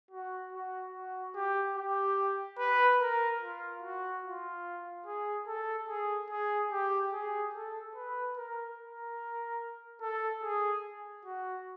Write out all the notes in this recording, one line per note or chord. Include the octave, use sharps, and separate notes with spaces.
F#4
F#4
F#4
G4
G4
B4
A#4
F4
F#4
F4
G#4
A4
G#4
G#4
G4
G#4
A4
B4
A#4
A#4
A4
G#4
F#4